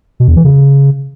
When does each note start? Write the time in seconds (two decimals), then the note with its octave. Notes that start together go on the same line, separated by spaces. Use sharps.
0.20 B2
0.28 E2
0.36 E3
0.45 C#3